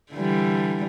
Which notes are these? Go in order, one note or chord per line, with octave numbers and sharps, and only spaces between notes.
D3 E3 G3